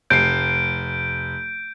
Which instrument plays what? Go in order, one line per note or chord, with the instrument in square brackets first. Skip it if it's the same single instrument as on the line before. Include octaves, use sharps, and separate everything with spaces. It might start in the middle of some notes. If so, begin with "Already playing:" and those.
[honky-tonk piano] F1 C7 [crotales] G6 D7